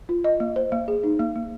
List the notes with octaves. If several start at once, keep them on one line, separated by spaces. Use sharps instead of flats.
F4
D#5
A#3
C5
A#3
G#4
D#4
A#3
A#3